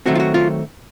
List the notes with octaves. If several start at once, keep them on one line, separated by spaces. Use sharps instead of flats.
D#3 F#3 A3 C4 F#4
F4
F#4
F4